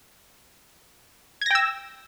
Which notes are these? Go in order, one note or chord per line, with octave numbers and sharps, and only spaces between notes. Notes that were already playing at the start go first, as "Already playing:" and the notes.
G5 E6 G#6 A#6